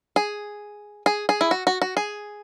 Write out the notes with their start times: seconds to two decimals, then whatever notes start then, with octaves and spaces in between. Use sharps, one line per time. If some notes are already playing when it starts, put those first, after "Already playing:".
0.16 G#4
1.06 G#4
1.29 G#4
1.41 E4
1.51 F#4
1.67 F#4
1.82 F#4
1.97 G#4